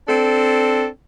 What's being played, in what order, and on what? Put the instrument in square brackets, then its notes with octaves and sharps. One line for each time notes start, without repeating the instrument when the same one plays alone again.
[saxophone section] C4 D4 A4